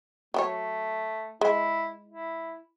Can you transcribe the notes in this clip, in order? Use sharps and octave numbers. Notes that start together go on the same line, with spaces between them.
F#3 A3 G4 C#5
G#3 E4
E4